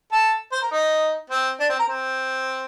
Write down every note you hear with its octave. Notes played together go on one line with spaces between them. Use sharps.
A4
C5
A#4
D#4
C4
D4
C4
A#4
C4